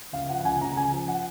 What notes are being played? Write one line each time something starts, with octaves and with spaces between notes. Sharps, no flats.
C#2 F5
F3 F#5
F#5
C#2 G#5
C#3 A#5
C#2 G#5
F3
F#5